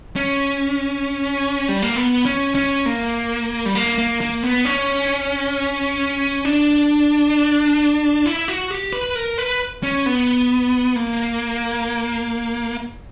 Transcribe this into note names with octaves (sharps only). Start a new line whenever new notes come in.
C#4
G3
A#3
B3
C#4
C#4
A#3
G3
A#3
A#3
A#3
B3
C#4
D4
E4
F#4
G4
B4
A#4
B4
C#4
B3
A#3